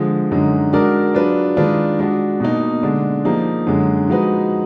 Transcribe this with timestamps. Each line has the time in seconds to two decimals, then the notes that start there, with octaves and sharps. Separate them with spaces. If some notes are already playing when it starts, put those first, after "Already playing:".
Already playing: D3 F3 G#3
0.31 F#2 D3 G#3 D#4
0.73 G#3 D4 F#4 A#4 D5
1.15 F#3 D4 F4 G#4 B4
1.57 D#3 G#3 D4 F4 B4
1.99 G#3 D4 F#4
2.40 B2 A#3 D#4
2.83 D3 G#3 D4
3.25 F3 A#3 D#4 G#4
3.67 F#2 D3 G#3
4.08 F3 G#3 D#4 F#4 B4